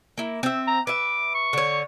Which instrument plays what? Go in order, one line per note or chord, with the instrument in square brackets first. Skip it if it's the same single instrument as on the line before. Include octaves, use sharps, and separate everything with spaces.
[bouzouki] A#3 E4
C4 E5
[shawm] A#5
[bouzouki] B4 E5 [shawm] D6
[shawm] C#6
[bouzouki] D3 C#5